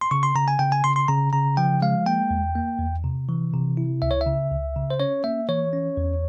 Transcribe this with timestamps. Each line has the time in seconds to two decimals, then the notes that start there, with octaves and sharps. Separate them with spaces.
0.01 C6
0.11 C#3 C#6
0.23 C6
0.35 C#3 A#5
0.48 G#5
0.59 C#3 G5
0.72 G#5
0.84 C#3 C6
0.96 C6
1.08 C#3 A#5
1.33 C#3 A#5
1.57 F3 G5
1.82 G#3 F5
2.06 A#3 G5
2.30 E2
2.56 A#3
2.80 E2
3.04 C3
3.29 E3
3.53 C3
3.77 E4
4.02 C#2 E5
4.11 C#5
4.21 E5
4.26 C#3
4.51 C#2
4.76 C#3
4.90 C5
5.00 C#4 C#5
5.24 A#3 E5
5.49 E3 C#5
5.73 C#4
5.97 E2